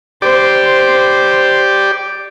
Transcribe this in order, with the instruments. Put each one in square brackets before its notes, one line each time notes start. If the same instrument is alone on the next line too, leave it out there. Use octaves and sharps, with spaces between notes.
[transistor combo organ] G4 D5 [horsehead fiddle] C5